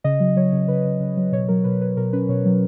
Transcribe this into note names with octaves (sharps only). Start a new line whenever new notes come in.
C#3 D#5
F#3
F#3 C#5
C#3
C#3 B4
C#3
C#3
F#3
B2 C#5
F#3 A#4
B2 B4
B2 B4
B2 A#4
C#4 B4
B2 C#5
F#3